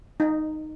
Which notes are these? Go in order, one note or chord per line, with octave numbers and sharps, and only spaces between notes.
D#4